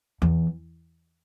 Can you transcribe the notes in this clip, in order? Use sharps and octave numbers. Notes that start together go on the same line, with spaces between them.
E2